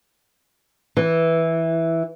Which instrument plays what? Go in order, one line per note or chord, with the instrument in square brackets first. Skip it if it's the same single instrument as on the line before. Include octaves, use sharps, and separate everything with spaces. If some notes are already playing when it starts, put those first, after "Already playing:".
[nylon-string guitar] E3